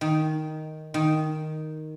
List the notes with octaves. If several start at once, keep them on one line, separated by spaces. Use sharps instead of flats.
D#3
D#3